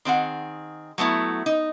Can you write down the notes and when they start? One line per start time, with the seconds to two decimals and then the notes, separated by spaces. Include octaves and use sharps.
0.05 D#3 C4 G#4 F#5
0.98 F#3 A3 B3 E4
1.46 D#4